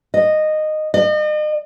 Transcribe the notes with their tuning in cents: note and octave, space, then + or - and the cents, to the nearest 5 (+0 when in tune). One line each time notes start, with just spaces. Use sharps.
D#5 -10
D#5 -40